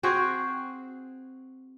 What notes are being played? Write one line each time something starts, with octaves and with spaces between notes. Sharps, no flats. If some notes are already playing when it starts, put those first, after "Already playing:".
C4 F#4 G#4 C5